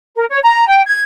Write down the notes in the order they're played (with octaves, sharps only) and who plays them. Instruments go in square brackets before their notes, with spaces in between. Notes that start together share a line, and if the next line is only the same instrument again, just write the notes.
[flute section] A#4
C#5
A#5
G5
G#6